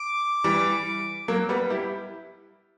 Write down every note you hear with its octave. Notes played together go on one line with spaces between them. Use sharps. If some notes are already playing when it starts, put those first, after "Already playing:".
Already playing: D6
E3 G3
F#3 A#3
G3 B3
E4 G4